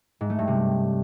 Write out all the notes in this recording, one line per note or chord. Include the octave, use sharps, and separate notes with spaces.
G#2
A3
G2
C3